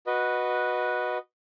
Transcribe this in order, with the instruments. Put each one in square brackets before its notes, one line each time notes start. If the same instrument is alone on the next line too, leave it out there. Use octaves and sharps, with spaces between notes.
[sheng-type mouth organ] F#4 B4 D#5